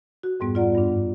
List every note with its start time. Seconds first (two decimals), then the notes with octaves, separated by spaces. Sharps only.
0.23 F#4
0.40 F2 G#2 G3 B3
0.55 F4 D5 F#5 A#5
0.75 G2 D4